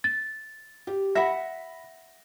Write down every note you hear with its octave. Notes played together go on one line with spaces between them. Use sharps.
A6
G4
E5 F#5 B5 A#6